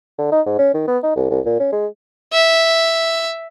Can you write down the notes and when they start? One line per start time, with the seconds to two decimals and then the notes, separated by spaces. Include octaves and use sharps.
0.19 D3
0.32 D#4
0.46 G#2
0.59 C#4
0.74 D#3
0.88 B3
1.03 D#4
1.16 C2
1.31 C2
1.46 A#2
1.60 C#4
1.72 G#3
2.33 E5